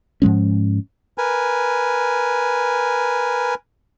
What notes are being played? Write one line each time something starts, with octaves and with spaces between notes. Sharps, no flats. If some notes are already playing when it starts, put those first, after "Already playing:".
G#2 F3 G#3 C#4
A#4 B4 G#5